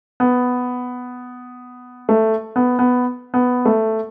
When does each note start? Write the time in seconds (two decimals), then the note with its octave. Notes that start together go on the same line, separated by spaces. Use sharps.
0.20 B3
2.09 A3
2.56 B3
2.79 B3
3.34 B3
3.65 A3